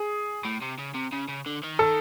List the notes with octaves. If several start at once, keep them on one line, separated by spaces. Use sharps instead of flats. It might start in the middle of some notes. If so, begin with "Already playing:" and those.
Already playing: G#4
A2
C3
C#3
C3
C#3
C#3
D3
D#3
A4